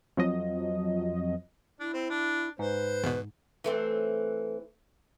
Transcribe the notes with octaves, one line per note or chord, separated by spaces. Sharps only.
F2 F3 F#3 D#5
D4 E4
C4
D4
G#2 B4 C5
E2 B2
E3 A3 C4